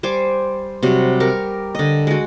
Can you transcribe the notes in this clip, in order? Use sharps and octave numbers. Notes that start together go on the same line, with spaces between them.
G3 C5 G#5 D6
C3 F#3 G3 F#4
G4 A#4 C#6
D3 D#5
G#3 F#4